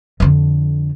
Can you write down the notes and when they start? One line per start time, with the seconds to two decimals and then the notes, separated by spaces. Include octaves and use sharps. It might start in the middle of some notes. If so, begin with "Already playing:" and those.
0.20 F2 D3